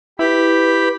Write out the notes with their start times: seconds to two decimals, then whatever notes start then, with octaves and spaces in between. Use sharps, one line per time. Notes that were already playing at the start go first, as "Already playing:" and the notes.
0.19 E4 G4 B4 B5